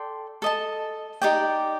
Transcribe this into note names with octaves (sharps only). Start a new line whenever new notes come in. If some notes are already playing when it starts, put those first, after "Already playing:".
Already playing: A4 D5 G5 C6
A4 D#5 A5
D#4 G4 D5 G5